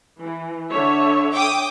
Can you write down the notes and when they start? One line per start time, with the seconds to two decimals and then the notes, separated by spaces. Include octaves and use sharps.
0.21 E3
0.73 D3 C#5 E5
1.34 G5 D6 D#6